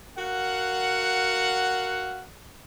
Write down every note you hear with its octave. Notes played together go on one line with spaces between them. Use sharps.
F#4 A#4 F5 F#5